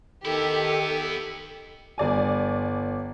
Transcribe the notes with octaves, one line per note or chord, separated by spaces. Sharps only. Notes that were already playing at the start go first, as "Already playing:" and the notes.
D#3 B3 E4 G4 A4
G1 D5 G#5